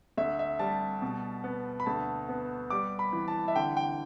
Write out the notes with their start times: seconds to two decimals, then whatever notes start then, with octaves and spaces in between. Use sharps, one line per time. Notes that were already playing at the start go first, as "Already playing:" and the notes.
0.17 D2 E5
0.39 E5
0.59 G3 A5
1.02 B2
1.44 B3
1.80 B5
1.86 D2 A5
2.29 B3
2.70 G3 D6
2.99 B5
3.13 E3
3.28 A5
3.48 E5
3.56 D3 G5
3.77 G5